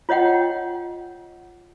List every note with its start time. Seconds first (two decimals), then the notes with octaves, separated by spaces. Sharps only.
0.09 F4 C#5 D#5 F#5 G5